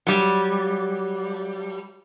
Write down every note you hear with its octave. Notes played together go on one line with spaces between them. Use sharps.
F#3 G3